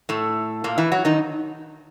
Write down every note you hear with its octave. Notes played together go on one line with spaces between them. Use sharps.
A2 A3
A#2 A#3
E3 E4
F#3 F#4
D#3 D#4